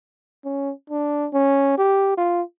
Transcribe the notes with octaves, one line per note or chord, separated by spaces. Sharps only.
C#4
D4
C#4
G4
F4